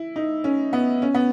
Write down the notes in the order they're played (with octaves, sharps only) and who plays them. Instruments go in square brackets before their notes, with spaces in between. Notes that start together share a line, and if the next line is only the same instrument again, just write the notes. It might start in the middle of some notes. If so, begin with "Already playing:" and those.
Already playing: [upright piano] E4
D#4
C#4
B3
C#4
B3